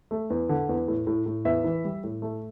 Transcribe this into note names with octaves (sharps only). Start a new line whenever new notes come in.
A3
E2
D3
E2
A2
A2
A2
E2 E5
E3
G3
A2
A3